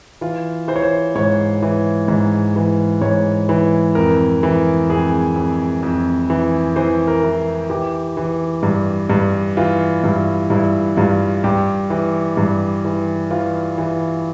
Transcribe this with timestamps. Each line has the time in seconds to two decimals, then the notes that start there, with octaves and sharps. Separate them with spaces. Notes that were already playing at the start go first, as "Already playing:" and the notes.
0.21 E3 F4
0.68 E3 C5
0.76 C#5
0.83 C5
1.15 G#2 C#5
1.62 E3
2.08 G#2
2.56 E3
3.02 G#2 C#5
3.49 E3
3.95 F2 A#4
4.43 E3
4.90 F2 G#4
5.36 F2
5.83 F2
6.30 E3
6.76 E3 C5
7.08 A#4
7.23 E3
7.70 E3 G4
8.17 E3
8.63 G2
9.10 G2
9.57 E3 F4
10.04 G2 E4
10.50 G2 E4
10.97 G2 F4
11.44 G2 G4
11.90 E3
12.37 G2
12.85 E3
13.30 E3 F4
13.78 E3